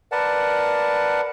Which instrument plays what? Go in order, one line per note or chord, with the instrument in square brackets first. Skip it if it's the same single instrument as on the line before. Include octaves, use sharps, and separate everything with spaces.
[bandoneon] A#4 B4 D5 F#5 A5